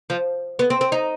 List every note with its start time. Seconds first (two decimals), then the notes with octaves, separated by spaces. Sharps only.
0.10 F3
0.59 B3
0.70 C4
0.81 C4
0.92 D#4